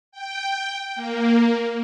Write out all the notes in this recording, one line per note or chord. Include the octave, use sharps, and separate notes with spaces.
G5
A#3